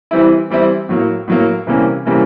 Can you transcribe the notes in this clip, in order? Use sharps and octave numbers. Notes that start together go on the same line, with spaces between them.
E3 G3 C4 E4
E3 G3 C4 E4
A2 F#3 A#3
A2 F#3 A#3
C3 E3 G3 A#3 C#4
C3 E3 G3 A#3 C#4